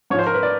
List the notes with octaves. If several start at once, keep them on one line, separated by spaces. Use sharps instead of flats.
G#2 F3 C#5
C5
A#4
B4
D5